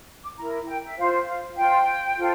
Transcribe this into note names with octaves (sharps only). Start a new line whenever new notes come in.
D6
E4 A#4 A#5
G5
E5
F4 C5 F5
F5
F4 C5 G5
F4 A4 C5